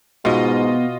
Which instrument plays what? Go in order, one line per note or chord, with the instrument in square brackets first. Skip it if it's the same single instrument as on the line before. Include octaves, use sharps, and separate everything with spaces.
[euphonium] G#2 [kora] B2 [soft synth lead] B3 [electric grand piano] F4 D#5